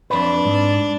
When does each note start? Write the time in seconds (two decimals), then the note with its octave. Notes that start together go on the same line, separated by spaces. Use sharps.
0.10 F2 D4 B4
0.45 G#2